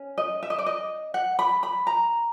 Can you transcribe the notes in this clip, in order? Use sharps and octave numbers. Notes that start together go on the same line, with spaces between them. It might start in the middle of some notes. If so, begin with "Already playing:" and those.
Already playing: C#4
D#5
E5
D#5
D5
D#5
F#5
B5
B5
A#5